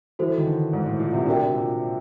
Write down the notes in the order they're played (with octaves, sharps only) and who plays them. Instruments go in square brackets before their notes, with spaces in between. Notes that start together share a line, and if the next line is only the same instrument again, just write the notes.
[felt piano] E3 [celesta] F#4 A4 C5
[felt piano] D#3
D3
G#2
A2
A#2
C3
[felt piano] C3 [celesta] D4 F#4 A#4 D5 G5
[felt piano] A#2